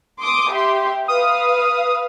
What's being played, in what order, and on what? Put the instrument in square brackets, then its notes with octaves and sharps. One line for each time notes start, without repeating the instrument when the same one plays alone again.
[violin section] C6 D6 D#6
G4 E5 C6
[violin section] B4 F5 [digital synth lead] D#6